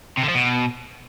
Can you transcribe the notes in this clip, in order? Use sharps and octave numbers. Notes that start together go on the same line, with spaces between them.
C3
D3
F3
B2